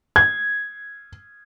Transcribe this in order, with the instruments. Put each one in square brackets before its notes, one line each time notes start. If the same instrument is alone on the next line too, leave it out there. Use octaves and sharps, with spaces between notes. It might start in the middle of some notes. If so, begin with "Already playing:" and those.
[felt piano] G#6